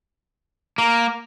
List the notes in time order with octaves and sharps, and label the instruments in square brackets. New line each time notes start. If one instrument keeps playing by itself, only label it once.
[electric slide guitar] A#3